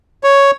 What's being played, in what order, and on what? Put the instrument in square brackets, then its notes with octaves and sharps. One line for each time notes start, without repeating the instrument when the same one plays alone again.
[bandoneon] C#5